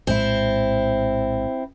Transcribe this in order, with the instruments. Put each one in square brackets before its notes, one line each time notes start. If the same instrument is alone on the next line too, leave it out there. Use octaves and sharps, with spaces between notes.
[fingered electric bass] A#1 A2 G#3 [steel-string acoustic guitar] C4 E4